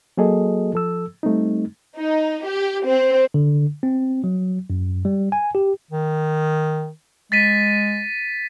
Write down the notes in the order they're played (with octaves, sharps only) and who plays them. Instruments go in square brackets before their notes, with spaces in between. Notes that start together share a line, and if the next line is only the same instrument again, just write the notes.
[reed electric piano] F#3 A#3 F#4 G#4 A4 D#5
F3 A4 E6
G3 A3 C4 D#4
[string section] D#4
G4
C4
[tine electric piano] D3
C4
F#3
F#2
G3
G#5
G4
[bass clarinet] D#3
[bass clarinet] G#3 [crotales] A6 B6 D#7